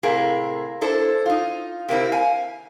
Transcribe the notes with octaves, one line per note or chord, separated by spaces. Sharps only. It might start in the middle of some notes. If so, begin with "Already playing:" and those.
A2 C3 A#3 G#4
D4 E4 A4 C5
D#4 F4
C3 A#3 C4 E4
F5 G#5